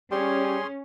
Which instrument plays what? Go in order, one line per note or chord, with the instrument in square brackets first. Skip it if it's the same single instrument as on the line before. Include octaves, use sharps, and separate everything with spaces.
[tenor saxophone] G3 [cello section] C#4 [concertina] G#4 C#5 C6